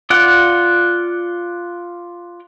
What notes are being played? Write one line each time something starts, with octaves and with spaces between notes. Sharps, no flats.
F4 D5 F#5